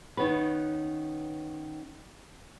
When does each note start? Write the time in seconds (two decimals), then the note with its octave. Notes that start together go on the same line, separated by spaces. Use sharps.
0.17 D#3 B3 C#4 B4